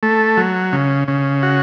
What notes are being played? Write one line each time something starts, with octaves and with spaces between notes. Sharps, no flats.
A3
F#3
C#3
C#3
F#4